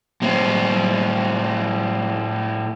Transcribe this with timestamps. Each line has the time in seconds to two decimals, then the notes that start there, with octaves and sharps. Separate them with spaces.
0.22 A2 C4